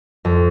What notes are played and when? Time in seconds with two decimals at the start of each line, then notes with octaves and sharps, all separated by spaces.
0.25 F2